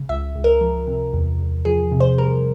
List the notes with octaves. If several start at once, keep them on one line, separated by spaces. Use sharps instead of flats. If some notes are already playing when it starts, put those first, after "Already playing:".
Already playing: C#3
C#2 E5
C#2
A#4
F3
C3
E2
E2
F3 G#4
C3
C5
G3 A#4